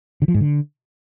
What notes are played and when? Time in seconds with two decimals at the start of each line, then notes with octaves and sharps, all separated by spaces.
0.22 D3
0.28 F3
0.34 G#2
0.41 D3